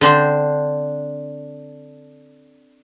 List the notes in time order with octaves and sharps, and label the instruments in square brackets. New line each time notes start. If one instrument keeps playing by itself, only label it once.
[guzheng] D3 C4 D4 C5